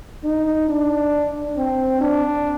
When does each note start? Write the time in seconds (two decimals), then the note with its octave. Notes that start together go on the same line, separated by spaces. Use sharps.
0.24 D#4
0.69 D4
1.57 C4
2.01 D4